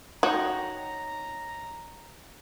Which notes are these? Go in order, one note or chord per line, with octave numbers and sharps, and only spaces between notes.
D#4 F#4 C#5 G5 A#5